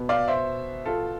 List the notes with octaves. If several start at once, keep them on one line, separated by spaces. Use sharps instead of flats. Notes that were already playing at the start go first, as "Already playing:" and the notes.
Already playing: B2 B3
D5 F5
C5 E5
F4 A4